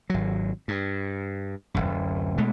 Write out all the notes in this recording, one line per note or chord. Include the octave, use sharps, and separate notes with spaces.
G#1 F#3
G2
D1 G1 F#2
B2 G#3 A3